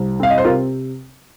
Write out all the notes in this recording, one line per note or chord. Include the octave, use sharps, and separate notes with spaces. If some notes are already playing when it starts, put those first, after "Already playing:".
Already playing: C2
C4 F5
D#5
C5
C3 F4 A#4